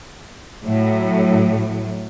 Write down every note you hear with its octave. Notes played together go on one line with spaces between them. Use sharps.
A2 F#3